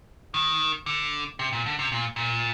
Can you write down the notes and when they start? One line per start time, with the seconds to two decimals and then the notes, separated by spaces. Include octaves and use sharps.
0.34 D#3
0.86 D3
1.39 C3
1.53 A#2
1.66 D3
1.79 C3
1.92 A#2
2.16 A#2